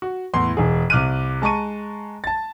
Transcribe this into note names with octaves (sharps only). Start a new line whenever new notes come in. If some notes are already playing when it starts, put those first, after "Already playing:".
F#4
E2 A2 C6
E1 G#4
C2 D6 F6 F#6 D#7
G#3 A5 A#5 C#6 D#7
A5 A6